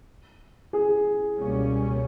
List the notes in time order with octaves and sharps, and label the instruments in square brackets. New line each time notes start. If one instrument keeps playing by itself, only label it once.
[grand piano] G#4
[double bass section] C#2 B2 G3 A#3 C#4